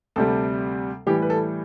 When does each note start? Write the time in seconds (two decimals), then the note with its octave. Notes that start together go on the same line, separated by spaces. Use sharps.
0.16 D2 C3 G3 A4
1.07 A2 E3 G3 G4
1.22 B4
1.30 A4